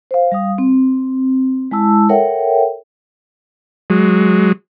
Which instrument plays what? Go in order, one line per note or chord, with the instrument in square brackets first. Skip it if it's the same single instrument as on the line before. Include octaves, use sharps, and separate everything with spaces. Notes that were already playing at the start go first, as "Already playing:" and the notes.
[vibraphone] C5 F5
G3 F5 D#6
C4
G#3 E4 A5 E6
A4 A#4 C#5 E5 F#5 G5
[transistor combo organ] F#3 G#3